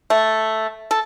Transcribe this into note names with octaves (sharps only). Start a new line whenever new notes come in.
A3
A4